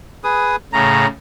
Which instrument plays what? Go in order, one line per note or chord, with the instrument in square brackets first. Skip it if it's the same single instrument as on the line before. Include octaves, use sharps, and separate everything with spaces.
[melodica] G#4 B4 D#6
[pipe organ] A2 C#3 [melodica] A#5